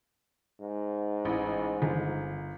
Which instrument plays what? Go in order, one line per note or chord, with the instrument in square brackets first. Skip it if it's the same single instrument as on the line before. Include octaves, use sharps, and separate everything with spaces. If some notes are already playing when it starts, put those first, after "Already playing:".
[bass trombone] G#2
[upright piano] A1
G1